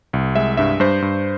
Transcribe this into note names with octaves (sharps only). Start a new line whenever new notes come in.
C2
G#3 E5
G2 E5
G2 C5
G2